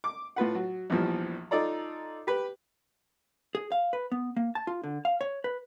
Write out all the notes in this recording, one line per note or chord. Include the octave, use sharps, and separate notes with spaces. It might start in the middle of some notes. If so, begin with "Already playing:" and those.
D6
A2 F4 B4 F#5
F#3
A#1 E2 E3 F3 G3
D#4 F4 A4 D5 A#5
G4 B4
G#4
F5
B4
B3
A#3
A5
F4
D3
F5
C#5
B4